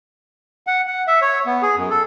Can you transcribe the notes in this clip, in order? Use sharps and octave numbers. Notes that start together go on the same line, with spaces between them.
F#5
F#5
E5
C#5
B3
G#4
F#2
A4